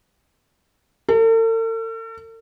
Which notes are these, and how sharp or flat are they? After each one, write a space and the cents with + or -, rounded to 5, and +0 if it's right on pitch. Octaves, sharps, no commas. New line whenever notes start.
A4 +45